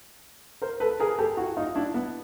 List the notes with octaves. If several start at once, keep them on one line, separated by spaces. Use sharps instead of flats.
A#4 C5
A4 B4
G#4 A#4
G4 A4
E4 F#4
D#4 F4
D4 E4
B3